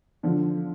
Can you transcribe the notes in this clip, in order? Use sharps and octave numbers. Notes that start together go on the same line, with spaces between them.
D3 F3